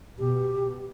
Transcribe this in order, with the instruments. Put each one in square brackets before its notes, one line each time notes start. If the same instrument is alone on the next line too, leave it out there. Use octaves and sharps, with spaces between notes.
[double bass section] B2 [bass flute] G4